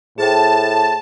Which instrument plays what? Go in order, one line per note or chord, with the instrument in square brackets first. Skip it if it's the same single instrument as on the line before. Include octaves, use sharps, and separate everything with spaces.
[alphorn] A2 [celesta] G#4 C5 G5 [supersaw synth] A5